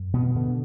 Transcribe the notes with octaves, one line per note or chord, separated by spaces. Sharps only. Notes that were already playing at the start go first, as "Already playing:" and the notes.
Already playing: F#2
B2 B3
B2 D3 B3